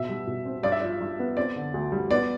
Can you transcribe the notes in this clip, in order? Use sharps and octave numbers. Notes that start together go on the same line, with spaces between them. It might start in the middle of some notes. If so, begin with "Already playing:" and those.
Already playing: B2 E5
G3
B2
C4
G2 D5
E5
F3 D5
G2
B3
C4 D5
D3
D2
G3
B3 D5